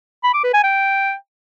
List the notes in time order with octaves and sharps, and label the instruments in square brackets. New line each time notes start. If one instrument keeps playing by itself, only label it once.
[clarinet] B5
D6
B4
G#5
G5